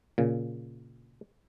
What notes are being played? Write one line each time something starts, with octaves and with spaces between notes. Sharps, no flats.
A#2 C#3